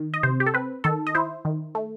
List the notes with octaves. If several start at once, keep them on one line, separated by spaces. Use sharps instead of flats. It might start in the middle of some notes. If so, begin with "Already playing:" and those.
Already playing: D#3
D#5
C3 C5
G4
A4
C4 B4
D#3 A4
D#5
E4 C5
D#3
A3